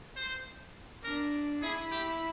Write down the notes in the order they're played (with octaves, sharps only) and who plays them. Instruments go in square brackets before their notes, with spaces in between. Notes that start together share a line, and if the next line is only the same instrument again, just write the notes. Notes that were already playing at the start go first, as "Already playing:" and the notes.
[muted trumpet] C5
[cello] D4 [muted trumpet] A#4
[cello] E4 [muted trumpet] G#4
[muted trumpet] G4